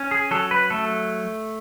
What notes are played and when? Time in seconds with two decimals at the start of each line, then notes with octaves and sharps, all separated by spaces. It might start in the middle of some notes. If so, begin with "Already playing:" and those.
Already playing: C#4
0.11 G#4
0.31 F#3 A4
0.51 B4
0.70 A3 A4